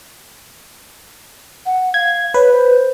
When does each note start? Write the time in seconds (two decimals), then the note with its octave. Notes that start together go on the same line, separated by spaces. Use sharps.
1.66 F#5
1.94 F5 G#6
2.34 B4 C#5
2.52 C5